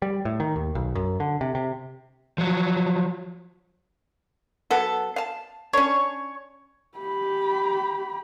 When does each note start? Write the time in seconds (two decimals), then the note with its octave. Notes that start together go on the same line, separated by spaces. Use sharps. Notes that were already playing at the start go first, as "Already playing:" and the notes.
0.02 G3
0.25 A2
0.40 D#3
0.56 D#2
0.75 B1
0.95 F#2
1.20 D3
1.41 C3
1.55 C3
2.38 F3 F#3
4.71 F#3 B3 A4
5.16 F5 A5
5.73 C#4 D4 C#5
6.98 G4 B5